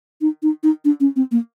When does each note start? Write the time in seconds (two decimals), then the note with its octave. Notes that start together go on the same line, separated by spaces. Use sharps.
0.21 D#4
0.43 D#4
0.63 D#4
0.85 D4
1.00 C#4
1.16 C4
1.32 A#3